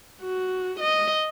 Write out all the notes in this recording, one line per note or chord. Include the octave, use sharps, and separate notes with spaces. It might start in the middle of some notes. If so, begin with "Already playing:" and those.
F#4
D#5